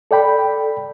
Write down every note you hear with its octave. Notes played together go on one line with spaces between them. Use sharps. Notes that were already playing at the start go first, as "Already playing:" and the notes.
A4 D5 G5 B5